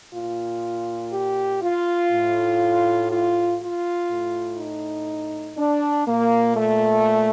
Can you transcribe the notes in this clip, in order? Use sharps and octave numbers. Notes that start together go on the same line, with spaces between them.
A#2 F4
G4
F4
A2
F4
F4
A2
D#4
D4
A#2 A#3
A3